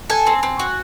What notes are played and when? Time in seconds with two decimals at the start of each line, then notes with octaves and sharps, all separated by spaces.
0.10 A4 G#5
0.27 C4
0.43 C4
0.59 F#4